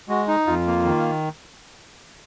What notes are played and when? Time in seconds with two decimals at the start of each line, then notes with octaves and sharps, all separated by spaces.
0.09 G#3 F#4
0.28 D#4
0.47 F2 F4
0.67 A#3
0.85 D#3